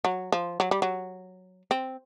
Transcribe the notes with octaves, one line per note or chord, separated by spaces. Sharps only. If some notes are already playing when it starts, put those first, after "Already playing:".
F#3
F3
F#3
G3
F#3
C4